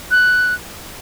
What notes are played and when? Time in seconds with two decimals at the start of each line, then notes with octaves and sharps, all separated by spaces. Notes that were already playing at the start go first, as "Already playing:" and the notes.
0.11 F#6